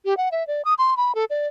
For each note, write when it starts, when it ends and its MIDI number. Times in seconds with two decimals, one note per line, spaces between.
0.05 0.17 67
0.17 0.29 78
0.32 0.46 76
0.47 0.62 74
0.65 0.74 87
0.78 0.97 84
0.97 1.15 83
1.15 1.25 69
1.30 1.47 74